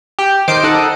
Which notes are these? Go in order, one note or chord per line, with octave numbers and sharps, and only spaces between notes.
G4
D#3 C5 D#5 D6 C7 D7
D#4 A4 D#5 F#5